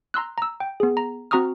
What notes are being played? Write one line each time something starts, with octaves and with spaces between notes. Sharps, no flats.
A#5 C6 E6 F#6
A#5 E6
G5
B3 G#4
A#5
C4 F#4 A#5 C#6 D#6 F6